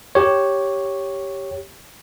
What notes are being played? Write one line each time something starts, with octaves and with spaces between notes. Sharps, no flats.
G4 C#5